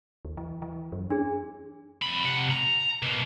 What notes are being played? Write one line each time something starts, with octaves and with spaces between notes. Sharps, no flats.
D#2
E3
E3
F#2
C#4 D4 G#4
F2 B5
C3 F#5
A#5
B2 A#3